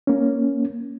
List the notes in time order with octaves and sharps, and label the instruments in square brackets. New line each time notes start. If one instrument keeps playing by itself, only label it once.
[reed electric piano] A#3 C#4